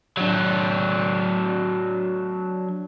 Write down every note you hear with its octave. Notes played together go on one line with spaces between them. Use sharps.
F#3 D4